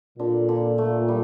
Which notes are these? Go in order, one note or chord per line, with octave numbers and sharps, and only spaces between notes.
A#2 D3
D3
A3
G3